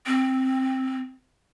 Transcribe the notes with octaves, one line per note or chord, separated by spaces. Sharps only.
C4